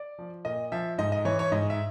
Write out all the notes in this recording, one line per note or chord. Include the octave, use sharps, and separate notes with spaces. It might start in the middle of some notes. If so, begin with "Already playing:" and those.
Already playing: D5
F3
A#2 D#5
F3 E5
G#2 D#5
D#5
E3 C#5
C#5
G#2 D#5
E5